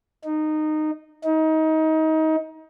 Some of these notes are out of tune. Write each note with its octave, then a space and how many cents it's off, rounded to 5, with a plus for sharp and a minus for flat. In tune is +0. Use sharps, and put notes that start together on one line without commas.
D#4 -15
D#4 +25